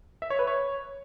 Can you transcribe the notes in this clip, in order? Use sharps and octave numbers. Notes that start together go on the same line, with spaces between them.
E5
C#5
B4
C#5